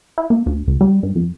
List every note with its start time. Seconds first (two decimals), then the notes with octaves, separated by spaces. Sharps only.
0.18 E4
0.30 A#3
0.46 D2
0.67 C#2
0.81 G3
1.03 G2
1.15 F2